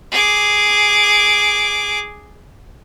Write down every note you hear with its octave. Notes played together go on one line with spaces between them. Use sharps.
G#4 D6